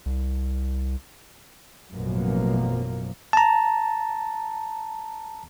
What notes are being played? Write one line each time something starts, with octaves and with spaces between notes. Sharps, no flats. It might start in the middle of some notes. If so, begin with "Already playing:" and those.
C2
A1 F#2 B2 F3 A#3
A5 A#5